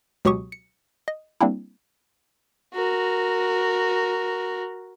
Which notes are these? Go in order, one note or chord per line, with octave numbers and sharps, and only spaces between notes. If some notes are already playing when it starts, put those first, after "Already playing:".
C#2 B2 F#3 G4 C#6 D#6
C#7
D#5
G3 A#3 C4 D4 E4
F#4 A#4